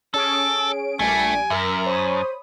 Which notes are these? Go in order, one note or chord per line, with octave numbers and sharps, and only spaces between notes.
C#4 G#4 A4 D7
A#1 G3 A3 G#5 D7
F#2 A#4 E5
C5 C#5 B5 D#6